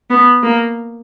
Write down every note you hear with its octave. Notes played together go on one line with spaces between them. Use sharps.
B3
A#3